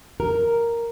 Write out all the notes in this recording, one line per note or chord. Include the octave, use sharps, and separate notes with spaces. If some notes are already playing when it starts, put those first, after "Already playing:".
A#4